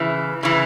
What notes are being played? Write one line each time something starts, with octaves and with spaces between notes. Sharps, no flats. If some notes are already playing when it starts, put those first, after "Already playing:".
Already playing: C#3 E3
C#3 E3